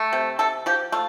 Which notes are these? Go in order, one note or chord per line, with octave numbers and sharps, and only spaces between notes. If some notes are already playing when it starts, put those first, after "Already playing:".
Already playing: A3
C3
C3 A4
F3 G4
A3 F4